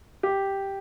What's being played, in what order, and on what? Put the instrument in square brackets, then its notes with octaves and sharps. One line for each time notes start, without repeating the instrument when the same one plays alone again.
[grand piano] G4